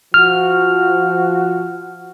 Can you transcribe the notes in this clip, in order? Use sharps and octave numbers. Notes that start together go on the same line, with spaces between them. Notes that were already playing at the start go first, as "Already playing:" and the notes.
F3 F#4 F6